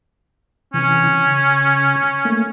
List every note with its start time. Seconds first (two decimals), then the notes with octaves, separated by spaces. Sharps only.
0.74 C3 E3 C#4
1.26 C#3
2.25 A3 A#3